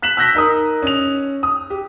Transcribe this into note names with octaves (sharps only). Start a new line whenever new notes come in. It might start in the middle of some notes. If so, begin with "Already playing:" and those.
F#6 B6 E7 F#7
E6 F#6 G6 A#6 B6
D#4 A#4 D#6
C#4 F7
D#6
G4